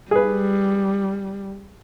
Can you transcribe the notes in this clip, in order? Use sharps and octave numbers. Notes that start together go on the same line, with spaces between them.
G3 G#4 B4